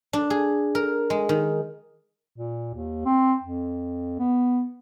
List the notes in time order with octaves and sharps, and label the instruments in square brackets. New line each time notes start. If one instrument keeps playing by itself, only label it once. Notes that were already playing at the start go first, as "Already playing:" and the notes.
[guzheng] D4
G#4
A#4
G#3
D#3
[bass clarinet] A#2
D#2
C4
F2
B3